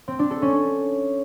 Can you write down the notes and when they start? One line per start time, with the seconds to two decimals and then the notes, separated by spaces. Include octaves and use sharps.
0.08 C4
0.19 D4
0.31 A4
0.42 C#4